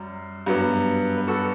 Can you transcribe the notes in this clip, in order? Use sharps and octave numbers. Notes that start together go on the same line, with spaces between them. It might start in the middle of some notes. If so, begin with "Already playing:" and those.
Already playing: F#2 G3
G2 F#3 B3
B4
F#4 A4